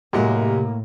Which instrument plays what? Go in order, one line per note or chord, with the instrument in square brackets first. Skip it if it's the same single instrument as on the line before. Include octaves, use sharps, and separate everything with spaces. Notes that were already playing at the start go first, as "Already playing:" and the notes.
[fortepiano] F#2 G#3 F#4 [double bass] A2 [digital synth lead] C3 [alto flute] A#3